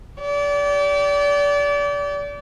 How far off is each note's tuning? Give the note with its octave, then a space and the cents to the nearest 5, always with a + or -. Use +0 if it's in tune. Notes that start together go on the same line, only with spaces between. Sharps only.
G4 -25 D5 -30